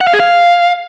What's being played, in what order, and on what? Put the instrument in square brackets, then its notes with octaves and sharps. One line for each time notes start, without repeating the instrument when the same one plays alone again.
[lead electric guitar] F#5
F5
G#4
F5